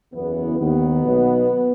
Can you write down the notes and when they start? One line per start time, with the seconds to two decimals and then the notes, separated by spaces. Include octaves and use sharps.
0.13 F#1 E2 C#3 E3 B3
0.59 D#2 D#3 B3
1.04 B1 B2